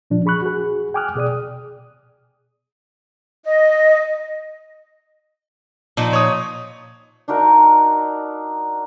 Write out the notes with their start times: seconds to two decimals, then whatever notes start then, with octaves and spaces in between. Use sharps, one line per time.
0.10 A#2 F3 D4
0.26 G#4 B5 C#6 F#6
0.42 F#4 G#4
0.94 G5 G#5 D6 D#6 F6 F#6
1.15 B2 G#4 D5 D#6
3.44 D#5
5.97 A#2 F3 D#4
6.13 C#5 D#6
7.28 D4 D#4 F#4 A#4